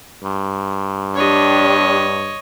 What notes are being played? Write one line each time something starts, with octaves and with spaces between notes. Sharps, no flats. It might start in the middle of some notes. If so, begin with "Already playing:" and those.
G2
D4 G4 C#5 D#5